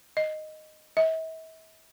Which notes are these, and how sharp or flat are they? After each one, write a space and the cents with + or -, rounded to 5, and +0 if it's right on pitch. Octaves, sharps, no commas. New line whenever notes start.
D#5 -5
E5 -45